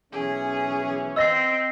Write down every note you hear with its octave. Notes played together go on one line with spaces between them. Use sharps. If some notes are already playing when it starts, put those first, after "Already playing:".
B1 E3 C#4 G#4
C4 D#5 F5 E6 A#6 C7